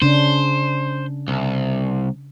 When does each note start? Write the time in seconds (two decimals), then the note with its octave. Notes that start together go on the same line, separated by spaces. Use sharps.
0.02 C#3 C#4 D4 C5
1.28 C2